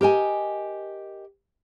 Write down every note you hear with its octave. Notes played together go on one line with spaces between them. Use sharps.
G4 A#4 D#5 G#5